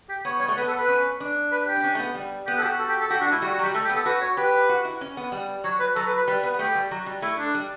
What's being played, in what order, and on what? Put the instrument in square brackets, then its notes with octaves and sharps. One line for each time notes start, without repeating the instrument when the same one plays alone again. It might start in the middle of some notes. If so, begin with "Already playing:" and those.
[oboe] G4
[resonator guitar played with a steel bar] B3 [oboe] C#5
[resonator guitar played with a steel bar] G3 [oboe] C#5
[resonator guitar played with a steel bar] A3
[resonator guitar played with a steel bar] B3 [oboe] B4
[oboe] A4
B4
[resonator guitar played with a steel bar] C#4
D4
[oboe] B4
G4
[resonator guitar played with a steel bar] D4
C#4
A3
B3
G3
[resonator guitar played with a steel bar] B3 [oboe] G4
[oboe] A4
[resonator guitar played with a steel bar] F#4 [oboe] G4
[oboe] A4
G4
A4
[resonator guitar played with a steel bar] F#4 [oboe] G4
[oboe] D4 [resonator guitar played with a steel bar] F#4
[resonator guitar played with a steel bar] A3 [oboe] E4
[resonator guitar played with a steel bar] G3 [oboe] F#4
[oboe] F#4
[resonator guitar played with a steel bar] F#3
[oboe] G4
[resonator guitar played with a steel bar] G3
[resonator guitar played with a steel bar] A3 [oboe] A4
[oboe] G4
[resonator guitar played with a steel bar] B3
[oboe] A4
[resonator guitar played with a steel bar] F#4 [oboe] B4
[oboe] C#5
[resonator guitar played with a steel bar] G4 [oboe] B4
[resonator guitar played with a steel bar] F#4
E4
C#4
B3
G3
[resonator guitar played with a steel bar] F#3 [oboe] C#5
[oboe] B4
[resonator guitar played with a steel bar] F#3 [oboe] A4
[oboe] B4
B4
[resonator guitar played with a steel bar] G3 [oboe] B4
[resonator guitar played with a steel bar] B3 [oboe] B4
[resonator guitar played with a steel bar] B3
[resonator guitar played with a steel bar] A3 [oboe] G4
[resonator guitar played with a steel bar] G3
F#3
G3
[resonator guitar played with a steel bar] A3 [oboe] E4
[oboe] D4
[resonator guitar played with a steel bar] G3